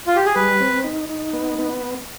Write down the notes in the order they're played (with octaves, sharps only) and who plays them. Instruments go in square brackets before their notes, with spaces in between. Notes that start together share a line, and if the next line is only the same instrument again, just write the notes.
[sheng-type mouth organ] F4
G4
G#4
[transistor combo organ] G3 [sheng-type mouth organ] B4
[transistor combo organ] C4
D#4
D#4
B3
B3